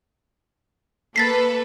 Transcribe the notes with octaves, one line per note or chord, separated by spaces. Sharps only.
A#3 A4 B4 A6 B6 C7